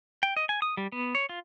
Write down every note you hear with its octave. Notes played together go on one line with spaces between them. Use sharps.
G5
D#5
G#5
D#6
G3
B3
C#5
F4